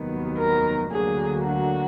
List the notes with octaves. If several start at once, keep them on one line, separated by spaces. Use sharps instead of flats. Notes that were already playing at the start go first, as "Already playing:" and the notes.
Already playing: F1 D#2 D#3 F#3 B3
A#4
D2 D3 F#3 A#3 G#4
F#4